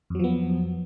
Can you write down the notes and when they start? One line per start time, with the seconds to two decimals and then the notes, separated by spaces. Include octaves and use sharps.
0.10 F2
0.15 F#3
0.19 F3
0.24 B3